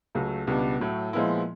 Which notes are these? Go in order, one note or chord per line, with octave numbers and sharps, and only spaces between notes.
C#2 C#3 F#3 A3
C#2 B2 G3 B3 D4
A2 F#3 A3
A#2 F3 G#3 B3 E4